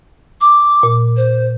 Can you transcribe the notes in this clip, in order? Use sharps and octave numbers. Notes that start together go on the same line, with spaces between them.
D6
A#2
C5